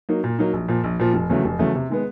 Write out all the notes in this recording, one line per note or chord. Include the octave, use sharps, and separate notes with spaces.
F#3 A#3 D#4
A#2
F#3 A#3 D#4
A#1
A#2 F3
A#1
A#2 F3
F1
E2 C#3 F#3 A3
F1
E2 C#3 F#3 A3
C3
D#3 G#3 B3